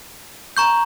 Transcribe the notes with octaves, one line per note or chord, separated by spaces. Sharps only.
A#5 C#6 G6